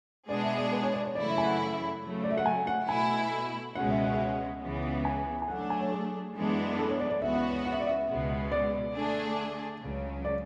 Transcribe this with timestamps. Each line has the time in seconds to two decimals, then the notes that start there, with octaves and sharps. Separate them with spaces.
0.29 B2 G#3 B3 D4 G#4 D5
0.43 E5
0.58 D5
0.72 B4
0.83 C#5
0.94 D5
1.05 C#5
1.15 F#2 C#3 E3 A3 E4 D5
1.30 E5
1.38 G#5
1.44 F#5
2.03 C#3 F#3 A3
2.24 D5
2.31 E5
2.38 F#5
2.46 G#5
2.67 F#5
2.88 B2 A3 E4 G#5
3.75 C#2 B2 G#3 C#4 F#5
3.90 E5
4.04 F#5
4.14 E5
4.18 F#5
4.62 C#2 C#3 E3 B3
5.05 G#5
5.42 G#5
5.48 F#3 A3 D4 F#5
5.59 F#5
5.70 G#5
5.81 C#5
5.92 G#4
6.34 F#2 E3 G#3 B3 D4
6.79 A4
6.89 C#5
7.00 D5
7.10 D5
7.22 C#2 C#3 E3 B3 F#4 E5
7.35 F#5
7.51 F#5
7.65 F#5
7.72 E5
7.80 D5
7.87 E5
8.07 C#2 B2 G#3 B3
8.52 D5
8.94 D3 A3 D4 G#4
9.81 C#2 C#3 F#3
10.25 D5